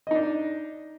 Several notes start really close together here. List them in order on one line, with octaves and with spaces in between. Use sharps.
D#5 D#4 D4